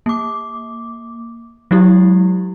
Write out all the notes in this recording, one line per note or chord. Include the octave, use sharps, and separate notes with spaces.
A#3 D6
F#3 G#3 E4 G4